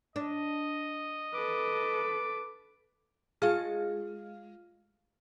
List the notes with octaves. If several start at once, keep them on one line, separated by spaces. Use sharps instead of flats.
D4 D#5
A4 B4 D6
G#3 F4 F5 F6